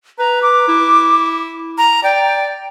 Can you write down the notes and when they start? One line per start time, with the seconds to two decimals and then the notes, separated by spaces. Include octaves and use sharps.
0.19 B4 A#5
0.42 D6
0.68 E4
1.78 A#5
2.04 D5 G5